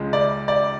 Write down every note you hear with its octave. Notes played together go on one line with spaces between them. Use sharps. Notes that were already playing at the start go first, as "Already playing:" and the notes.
Already playing: C#2 C#3 G#3
D5
D5